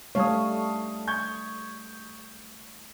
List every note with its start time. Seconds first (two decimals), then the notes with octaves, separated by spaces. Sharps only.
0.15 G3 A3 C#5 F5 A5 D#6
1.07 C#6 G6 G#6